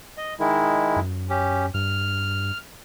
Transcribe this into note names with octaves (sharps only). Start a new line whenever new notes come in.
D#5
D#3 G#3 E4
F#2
C#4 G4
G2 F6